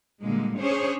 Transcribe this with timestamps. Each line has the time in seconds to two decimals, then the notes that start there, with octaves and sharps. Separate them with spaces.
0.23 A#2 D3 G3 G#3 A#3
0.59 C#4 D4 G#4 C5 C#5